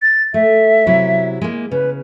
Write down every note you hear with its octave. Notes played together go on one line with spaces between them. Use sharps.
A6
A3 E5
C3 F#3 E4
G#3 A#3
C#3 B4